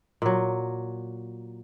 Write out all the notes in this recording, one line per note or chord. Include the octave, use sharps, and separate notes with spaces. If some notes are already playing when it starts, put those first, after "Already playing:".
A#2 F#3